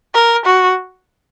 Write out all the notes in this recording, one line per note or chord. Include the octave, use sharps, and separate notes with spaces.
A#4
F#4